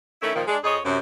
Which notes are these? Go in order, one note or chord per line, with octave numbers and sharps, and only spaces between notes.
D#3 A3 C#4 E4
A#2 D#3 F3 A#3
G#3 D4
F2 G#4 C#5 D#5
F#2 C3